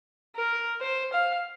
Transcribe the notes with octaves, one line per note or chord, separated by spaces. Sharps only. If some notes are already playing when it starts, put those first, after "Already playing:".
A#4
C5
F5